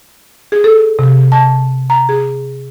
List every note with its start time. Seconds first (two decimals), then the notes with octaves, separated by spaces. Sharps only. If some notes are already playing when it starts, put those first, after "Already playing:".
0.52 G#4
0.64 A4
0.99 C3
1.32 A5
1.90 A#5
2.09 G#4